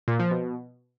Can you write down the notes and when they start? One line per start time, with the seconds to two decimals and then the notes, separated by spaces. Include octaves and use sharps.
0.08 A#2
0.19 F3
0.31 B2